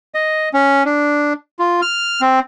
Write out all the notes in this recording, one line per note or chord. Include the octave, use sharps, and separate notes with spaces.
D#5
C#4
D4
F4
F6
C4